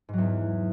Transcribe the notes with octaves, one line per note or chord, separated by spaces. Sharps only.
E2 G#2 F#3